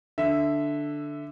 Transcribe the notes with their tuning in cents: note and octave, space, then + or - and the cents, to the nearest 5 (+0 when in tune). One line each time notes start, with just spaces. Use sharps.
D3 +0 E5 +0